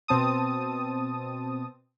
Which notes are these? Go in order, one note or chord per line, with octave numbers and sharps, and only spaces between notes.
B2 C4 A5 D#6